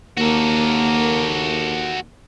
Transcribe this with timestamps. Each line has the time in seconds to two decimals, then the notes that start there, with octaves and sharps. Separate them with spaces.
0.17 D#2 A#3 F#4 A4